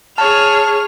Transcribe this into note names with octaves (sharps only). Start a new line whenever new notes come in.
G#4 C#5 A5 F6